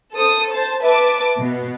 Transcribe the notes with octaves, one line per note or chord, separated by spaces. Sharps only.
A4 C5 D#6
C5 A5
B4 E5 A5 D6
B2 B3